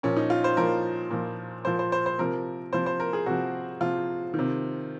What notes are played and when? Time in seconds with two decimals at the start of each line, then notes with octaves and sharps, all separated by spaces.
0.03 A#2 F3 C#4
0.17 D#4
0.30 F4
0.44 C5
0.57 A#2 F3 A#4
1.11 A#2 F3
1.65 A#2 F3 C5
1.79 C5
1.92 C5
2.06 C5
2.18 C3 F3 A#4
2.72 C3 F3 C5
2.86 C5
3.00 A#4
3.13 G#4
3.26 C3 F3 F#4
3.81 C3 F3 F4
4.34 D#3
4.39 C3